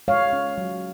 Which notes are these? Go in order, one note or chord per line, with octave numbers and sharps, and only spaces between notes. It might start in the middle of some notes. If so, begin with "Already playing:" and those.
G#3 C#5 F5
C#4
F#3